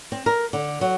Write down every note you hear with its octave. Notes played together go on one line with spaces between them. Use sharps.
C4
A#4
D3
F#3